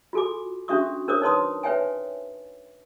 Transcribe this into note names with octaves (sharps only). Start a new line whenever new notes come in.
F4 F#4 A4 G#5 D6
C#4 D4 F#4 E5 C#6 D#6
D4 A#4 C5 C#5 D6 D#6
D#4 B4 C#5 A5 C6 D#6
B4 C#5 E5 G5 G#5